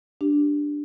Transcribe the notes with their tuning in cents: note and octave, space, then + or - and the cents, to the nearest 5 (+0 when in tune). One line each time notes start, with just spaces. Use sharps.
D4 +0 G4 +0